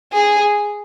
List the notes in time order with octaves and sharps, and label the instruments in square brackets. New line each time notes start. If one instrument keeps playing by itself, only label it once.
[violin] G#4